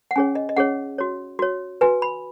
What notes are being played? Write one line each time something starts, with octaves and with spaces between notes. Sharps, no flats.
F#5
C#4 G#4 C#5 G#5
D#5
D#5
C#4 G#4 C#5 F#5
F#4 C#5
F#4 C#5
F#4 B4 G#5
B5